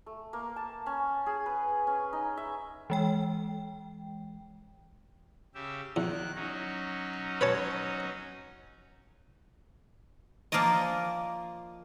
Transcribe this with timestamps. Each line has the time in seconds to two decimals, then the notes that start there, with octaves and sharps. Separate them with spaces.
0.06 A3
0.33 A#3
0.56 A5
0.86 C#4
1.26 G#4
1.46 B4
1.87 C#4
2.13 D#4
2.37 E5
2.90 E3 G#3 G5
5.55 C#3 G4 E5
5.96 E2 D#3 F#6
6.35 F#3 C#4 D#4
7.41 B4 C#5 A5
10.52 F3 A#3 F4 D5 D#5